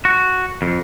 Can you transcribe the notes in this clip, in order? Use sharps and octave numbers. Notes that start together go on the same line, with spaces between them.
F#4
F2